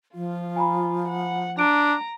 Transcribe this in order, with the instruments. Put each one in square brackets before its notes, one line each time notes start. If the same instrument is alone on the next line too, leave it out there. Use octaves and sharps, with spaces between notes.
[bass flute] F3 [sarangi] F4
[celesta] G#5 A#5 B5
[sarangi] F#5
[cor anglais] D4 [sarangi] A#5 [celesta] D7